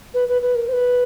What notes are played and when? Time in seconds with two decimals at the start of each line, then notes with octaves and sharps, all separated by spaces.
0.14 B4
0.29 B4
0.42 B4
0.55 A#4
0.68 C5
0.73 B4